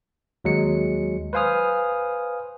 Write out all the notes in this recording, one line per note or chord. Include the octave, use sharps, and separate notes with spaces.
D#2 F#3 G#3 C#7
B4 C5 F5 G#5 D#6 F6